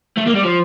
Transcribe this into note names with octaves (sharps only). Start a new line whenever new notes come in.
A3
A#3
G3
F3